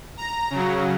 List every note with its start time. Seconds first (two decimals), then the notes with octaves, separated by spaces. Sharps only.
0.17 A#5
0.50 C#3 F#3